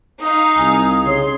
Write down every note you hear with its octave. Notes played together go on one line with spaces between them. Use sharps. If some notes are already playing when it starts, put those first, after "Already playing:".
D#4 F5 D#6
C2 G#5
C#3 C#5 C6